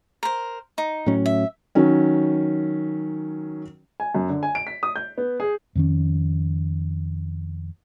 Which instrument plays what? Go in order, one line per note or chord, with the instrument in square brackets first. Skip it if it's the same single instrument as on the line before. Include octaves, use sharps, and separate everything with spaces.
[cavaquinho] A#4 C5
D#4
[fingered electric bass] A2 F#3 C#4
[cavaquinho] E5
[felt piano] D#3 F#3 C#4
[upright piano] G#5
F#2
D3
G#5
D7
B6
D#6
G6
B3
G#4
[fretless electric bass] F2 D#3 C#4